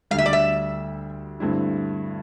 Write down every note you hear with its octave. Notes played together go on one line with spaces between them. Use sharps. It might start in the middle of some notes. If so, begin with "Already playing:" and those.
D2 D3 G3 F5
E5
D5
E5
G2 D3 A3 C4 E4